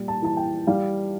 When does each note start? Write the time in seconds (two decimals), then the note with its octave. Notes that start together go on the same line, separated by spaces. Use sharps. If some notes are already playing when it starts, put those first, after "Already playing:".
Already playing: A#2 G3
0.08 A5
0.22 E3 A5
0.37 G5
0.67 G3 F5